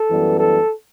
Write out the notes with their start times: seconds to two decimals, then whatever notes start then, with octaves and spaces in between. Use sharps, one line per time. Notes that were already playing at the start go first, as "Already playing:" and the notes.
Already playing: A4
0.09 F#2 E3 G3 B3
0.39 A4